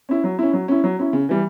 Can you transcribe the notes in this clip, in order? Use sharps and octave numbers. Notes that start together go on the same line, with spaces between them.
C#4 E4
F#3
C#4 E4
F#3
C#4 E4
F#3
C#4 E4
C#3
E3 G3